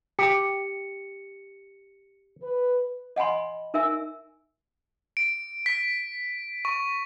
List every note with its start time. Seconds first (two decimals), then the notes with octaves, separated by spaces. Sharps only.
0.19 G4 C#7
2.42 B4
3.16 D#5 F#5 G#5 B5 C6
3.74 D#4 A#4 E5 G#5 E6
5.17 D7
5.66 B6
6.65 C#6